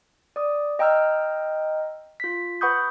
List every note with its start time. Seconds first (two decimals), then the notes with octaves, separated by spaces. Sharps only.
0.36 D5 D#6
0.79 D#5 G5 A#5 E6 F6
2.20 F4 B6
2.61 B4 F#5 B5 C#6 D#6 G6